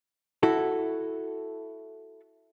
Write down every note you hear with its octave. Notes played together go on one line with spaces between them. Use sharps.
E4 F#4 A4